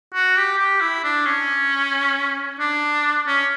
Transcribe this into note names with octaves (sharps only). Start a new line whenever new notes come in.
F#4
G4
G4
E4
D4
C#4
D4
C#4